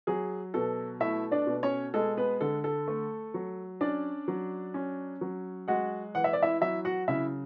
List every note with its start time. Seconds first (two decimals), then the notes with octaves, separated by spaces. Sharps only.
0.07 F#3 G#4
0.54 B2 A4
1.00 A3 E4 E5
1.31 D4 D5
1.47 B2
1.63 C#4 C#5
1.94 G#3 A4
2.17 B3 B4
2.41 D3 A4
2.64 A4
2.88 A3
3.34 F#3
3.81 C#4 D4 D5
4.28 F#3
4.74 C#4
5.21 F#3
5.68 G#3 F#4 F#5
6.15 E3 F#5
6.24 E5
6.33 D5
6.43 E4 E5
6.61 F#3 E4 E5
6.85 F#4 F#5
7.08 C#3 E4 E5